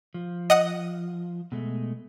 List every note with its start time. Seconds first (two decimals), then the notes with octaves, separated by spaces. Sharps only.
0.14 F3
0.50 D#5 F#5 D#6
1.52 B2 G#3 A3